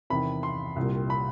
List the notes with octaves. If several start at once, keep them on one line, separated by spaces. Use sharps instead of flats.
E2 C3 D#3 B5
C6
C2 A#2 G3
B5